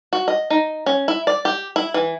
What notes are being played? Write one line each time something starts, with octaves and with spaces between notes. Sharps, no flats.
F#4
D#5
D#4
C#4
E4
D5
G4
E4
E3